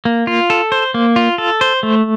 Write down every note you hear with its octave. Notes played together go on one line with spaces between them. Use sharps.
A#3
F4
A4
C5
A#3
F4
A4
C5
A3